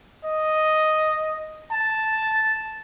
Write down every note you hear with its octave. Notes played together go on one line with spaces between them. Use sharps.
D#5
A5